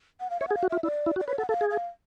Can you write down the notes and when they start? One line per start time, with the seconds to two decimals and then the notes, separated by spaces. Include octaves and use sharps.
0.20 F#5
0.30 F5
0.40 C#5 E5
0.48 F#5
0.51 G#4
0.55 F5
0.63 F#4
0.70 F4 E5
0.83 E4 D5
1.06 E4
1.16 F#4
1.20 D5
1.27 B4 C#5
1.38 A4 F#5
1.49 A4 F5
1.61 G#4
1.71 F5